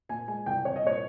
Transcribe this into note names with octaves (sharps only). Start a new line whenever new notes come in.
A#2 G#5
G#3 G#5
C2 G5
C2 C#5
D#5
A#2 C#5